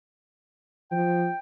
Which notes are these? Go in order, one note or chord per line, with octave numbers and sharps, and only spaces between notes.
F3 G5